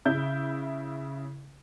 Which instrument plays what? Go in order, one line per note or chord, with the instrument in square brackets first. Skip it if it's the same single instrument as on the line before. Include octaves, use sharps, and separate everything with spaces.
[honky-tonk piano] C#3 E4 G6